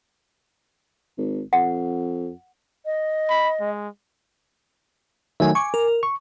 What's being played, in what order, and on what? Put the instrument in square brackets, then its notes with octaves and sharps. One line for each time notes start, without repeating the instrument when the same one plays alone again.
[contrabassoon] G#1
[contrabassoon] F2 [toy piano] F#5
[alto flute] D#5
[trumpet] B5
G#3
[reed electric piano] D#3 F#3 A3 [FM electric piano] E5 G#5
[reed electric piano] G#5 D6 [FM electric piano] C#6
[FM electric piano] A#4
[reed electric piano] C#6